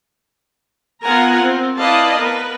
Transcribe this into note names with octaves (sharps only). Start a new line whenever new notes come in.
B3 F4 A#4 F#5 G#5 A#5
C4
E4 B4 D5 D#5 F5 A5
B3 A#4 B4